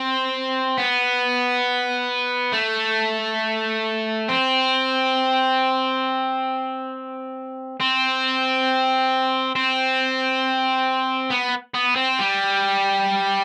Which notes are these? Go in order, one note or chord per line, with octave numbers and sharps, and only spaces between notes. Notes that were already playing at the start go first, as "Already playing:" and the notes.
Already playing: C4
B3
A3
C4
C4
C4
B3
B3
C4
G3